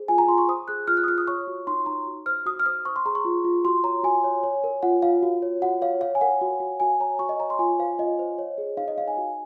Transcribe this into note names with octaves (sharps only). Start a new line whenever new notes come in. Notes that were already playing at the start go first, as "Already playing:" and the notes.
Already playing: G#4 C5
F4 G#5
A#5
F4 C6
C#6
C5 D#6
G#4 F#6
F4 F6
F#6
D#6
F4 F6
D#6
C#5 C#6
F#4
D#4 C6
D#4 A#5
F#4
C5 F6
F#4 D#6
F6
C5 D#6
C5 C#6
C6
G#4 A#5
C#6
F4
F4
F#4 C6
C#5 A#5
F#4 G#5
C#5
C#5
A#4
F4 F#5
F4 F5
F#4
C#5
F#4 F#5
C#5 F5
C#5 F5
G#5
A#4 F#5
F#4
F#4
F#4 G#5
C#5 A#5
F#4 C#6
D#5
C#5 A#5
C6
F4 G#5
C5 F5
F4 D#5
C5
C#5
G#4
D#4 F5
D#5
D#4 F5
G#5
F#4